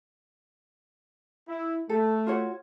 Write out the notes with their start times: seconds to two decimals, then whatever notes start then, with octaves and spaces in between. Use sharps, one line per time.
1.48 E4
1.89 A3 A4
2.27 F4 F#4 C#5